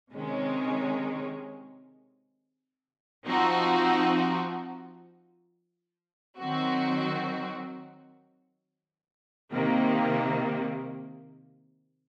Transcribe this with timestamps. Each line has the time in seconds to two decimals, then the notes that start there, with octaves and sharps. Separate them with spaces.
0.14 C3 D#3 G#3 C#4
3.27 F3 C4 D#4 F#4
6.39 D#3 F#3 C4 F#4
9.52 C3 D#3 A#3